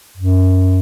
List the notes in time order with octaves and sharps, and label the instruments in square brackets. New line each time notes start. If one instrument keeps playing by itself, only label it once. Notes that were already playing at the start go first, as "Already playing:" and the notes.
[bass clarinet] F#2